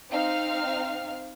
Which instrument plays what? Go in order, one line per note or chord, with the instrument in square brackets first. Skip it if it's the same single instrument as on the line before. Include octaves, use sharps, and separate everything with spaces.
[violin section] C4 D#4 F5 F6